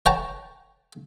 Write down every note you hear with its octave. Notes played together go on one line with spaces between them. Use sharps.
C#5 F#5 G5 A5 A#5